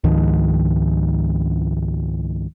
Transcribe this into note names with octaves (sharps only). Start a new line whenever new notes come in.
C#2 G#2 D#3 F3